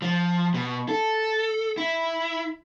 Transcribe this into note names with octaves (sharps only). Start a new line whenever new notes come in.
F3
B2
A4
E4